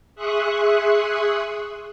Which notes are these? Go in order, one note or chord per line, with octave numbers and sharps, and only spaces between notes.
G#4 E5 C6 C#6 D#6 F#6